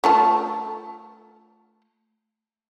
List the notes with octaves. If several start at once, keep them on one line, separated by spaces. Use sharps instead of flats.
A3 F4 A5